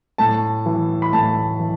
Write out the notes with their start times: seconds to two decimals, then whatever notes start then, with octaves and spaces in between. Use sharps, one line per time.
0.18 A2 A5
0.66 E3
1.02 B5
1.13 A2 A5
1.60 E3